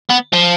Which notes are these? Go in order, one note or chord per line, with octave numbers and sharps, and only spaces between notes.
B3
F3